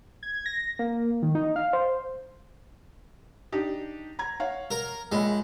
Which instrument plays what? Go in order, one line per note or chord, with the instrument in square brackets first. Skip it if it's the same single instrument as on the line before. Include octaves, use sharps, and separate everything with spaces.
[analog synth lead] G#6
A#6
A#3
D#3
D#4
F5
C5
[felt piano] D4 D#4 G4
A#5 G#6
C#5 F5 F#5
[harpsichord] A#4
[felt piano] A#1 C#5 B5 [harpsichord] G#3